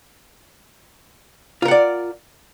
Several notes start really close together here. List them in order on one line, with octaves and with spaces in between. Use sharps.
F4 A#4 F#5 D5